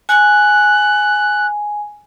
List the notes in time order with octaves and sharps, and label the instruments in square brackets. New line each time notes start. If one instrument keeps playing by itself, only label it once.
[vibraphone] G#5 [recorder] F#6